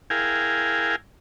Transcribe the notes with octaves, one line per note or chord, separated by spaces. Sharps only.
E4 G#4 A#4 F5 G5 G#5